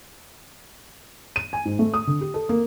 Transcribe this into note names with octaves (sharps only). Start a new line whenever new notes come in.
D#7
G#5
G#2
A3
D#6
D3
G4
A4
A#3